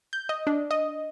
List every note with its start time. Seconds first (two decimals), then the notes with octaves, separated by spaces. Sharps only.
0.13 G6
0.29 D#5
0.47 D4
0.71 D#5